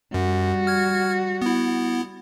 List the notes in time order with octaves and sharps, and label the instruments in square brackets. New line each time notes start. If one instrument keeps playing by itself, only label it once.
[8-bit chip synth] F#2 [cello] G3 F#4
[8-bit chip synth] F6 G#6
B3 E4